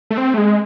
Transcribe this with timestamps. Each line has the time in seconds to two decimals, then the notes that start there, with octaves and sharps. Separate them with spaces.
0.10 A3
0.18 C4
0.34 A3
0.37 G#3